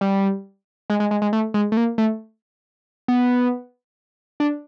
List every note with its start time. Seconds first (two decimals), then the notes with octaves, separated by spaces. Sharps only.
0.01 G3
0.90 G#3
1.00 G#3
1.11 G#3
1.22 G#3
1.33 A3
1.54 G#3
1.72 A3
1.77 A#3
1.98 A3
3.08 B3
4.40 D4